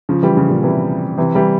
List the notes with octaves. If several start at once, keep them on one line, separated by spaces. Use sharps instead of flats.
C#3 F3
E3 G3
C#3 F3
A#2 C#3
C3 E3
C3 E3
E3 G3